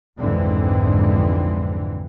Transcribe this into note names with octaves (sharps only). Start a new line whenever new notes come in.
B1 F2 G#2 D3 E3 C4